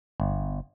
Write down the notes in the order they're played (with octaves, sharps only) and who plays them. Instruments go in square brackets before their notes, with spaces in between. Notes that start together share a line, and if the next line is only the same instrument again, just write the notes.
[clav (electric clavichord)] G1